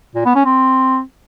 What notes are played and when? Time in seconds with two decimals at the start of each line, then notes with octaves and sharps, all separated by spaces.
0.15 A#2
0.25 B3
0.35 C#4
0.45 C4